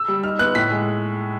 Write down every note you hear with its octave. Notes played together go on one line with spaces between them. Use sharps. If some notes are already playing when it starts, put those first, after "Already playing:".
Already playing: E6
G3
D#4 F6
B3 F#6
A2 B6
G#3